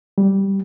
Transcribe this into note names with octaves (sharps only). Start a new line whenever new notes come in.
G3